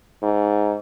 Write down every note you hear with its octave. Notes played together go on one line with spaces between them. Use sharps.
G#2